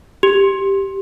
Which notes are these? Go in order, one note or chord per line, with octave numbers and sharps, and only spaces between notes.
G4